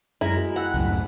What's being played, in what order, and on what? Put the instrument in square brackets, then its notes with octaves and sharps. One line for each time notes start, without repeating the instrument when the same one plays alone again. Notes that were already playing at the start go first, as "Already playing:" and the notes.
[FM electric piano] F#2 A#5 [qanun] G#3 A#4 [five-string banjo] E4
[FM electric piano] F#4
[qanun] F#5 [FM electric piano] G5 E6 F#6
[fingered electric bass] C#2 F#2 A2
[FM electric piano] B5